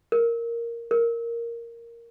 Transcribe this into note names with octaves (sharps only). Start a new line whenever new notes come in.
A#4
A#4